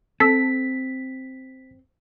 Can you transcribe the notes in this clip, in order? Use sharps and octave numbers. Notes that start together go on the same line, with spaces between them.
C4 A4 B6